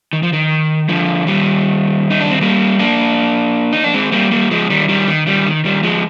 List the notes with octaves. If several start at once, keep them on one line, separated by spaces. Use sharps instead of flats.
D#3
F3
D#3
D3 F3
D#3 G3
D#4
D4
C4
G3 A#3
A#3 D4
D#4
D4
G#3 C4
G3 A#3
G3 A#3
F3 G#3
D#3 G3
D#3 G3
D#3
D#3 G3
D#3
D#3 G3
F3 G#3